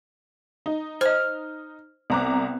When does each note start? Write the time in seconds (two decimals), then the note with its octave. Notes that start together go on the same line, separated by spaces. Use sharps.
0.66 D#4
1.01 C5 D#5 F6
2.10 C2 B3 C4 A#5 D6 F#6